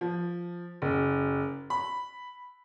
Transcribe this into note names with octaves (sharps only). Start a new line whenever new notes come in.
F3
F#1
B5